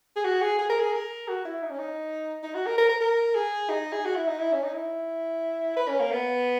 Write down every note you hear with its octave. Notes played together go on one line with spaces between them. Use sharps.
G#4
F#4
G#4
G#4
A#4
G#4
A#4
F#4
E4
D#4
C#4
D#4
D#4
F#4
A#4
A#4
A#4
A#4
G#4
D#4
G#4
F#4
E4
D#4
E4
C#4
D#4
E4
B4
C#4
A#3
B3